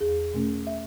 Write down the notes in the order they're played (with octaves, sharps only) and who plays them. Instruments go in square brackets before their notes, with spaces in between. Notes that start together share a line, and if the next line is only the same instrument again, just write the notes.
[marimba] E2 G#4
B2 A3 C#4
E5